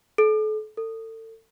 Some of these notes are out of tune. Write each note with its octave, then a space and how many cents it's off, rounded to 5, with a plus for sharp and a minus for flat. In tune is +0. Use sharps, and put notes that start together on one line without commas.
A4 -35
A4 +30